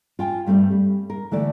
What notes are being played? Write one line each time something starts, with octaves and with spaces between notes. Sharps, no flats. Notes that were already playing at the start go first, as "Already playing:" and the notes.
F4 G5 G#5
G2 G3 A3 C4
G3
A#4
D3 E3 A3 D5